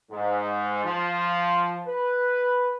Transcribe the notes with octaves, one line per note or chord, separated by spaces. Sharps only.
G#2
F3
B4